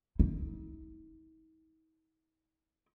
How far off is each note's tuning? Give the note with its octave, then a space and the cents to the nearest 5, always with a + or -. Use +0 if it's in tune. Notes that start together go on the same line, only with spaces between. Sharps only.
D#4 +45